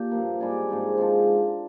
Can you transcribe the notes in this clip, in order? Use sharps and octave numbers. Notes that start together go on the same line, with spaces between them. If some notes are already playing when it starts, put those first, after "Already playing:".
Already playing: A#2 D4 G4
G2 F3 A#3
G#2 G3 D4 G#4
G#2 F3 C4
F3 G#3 D4